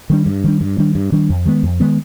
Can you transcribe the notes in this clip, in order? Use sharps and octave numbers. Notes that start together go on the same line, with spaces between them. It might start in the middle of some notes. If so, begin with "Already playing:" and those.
D#3 G3 D4
G2
D#3 G3 D4
G2
D#3 G3 D4
G2
D#3 G3 D4
F2
D#3 G#3 B3
F2
D#3 G#3 B3